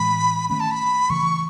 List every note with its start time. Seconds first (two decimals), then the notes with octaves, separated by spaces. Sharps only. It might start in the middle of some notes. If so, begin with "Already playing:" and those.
Already playing: A2 E3 G#3 B5
0.50 D#3 A3 C#4 B5
0.60 A5
0.71 B5
1.10 C#3 E3 A3 C#6